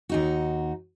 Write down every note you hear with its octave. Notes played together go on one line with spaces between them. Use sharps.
D#2 D#4 F#4